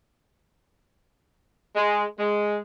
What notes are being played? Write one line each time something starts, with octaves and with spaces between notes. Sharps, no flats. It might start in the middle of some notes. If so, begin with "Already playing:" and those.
G#3
G#3